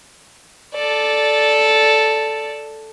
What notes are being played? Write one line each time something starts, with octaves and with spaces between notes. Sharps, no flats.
A4 D5